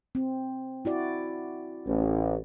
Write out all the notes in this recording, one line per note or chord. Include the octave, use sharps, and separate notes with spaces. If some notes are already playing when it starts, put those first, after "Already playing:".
C4
E4 F#4 D5
A1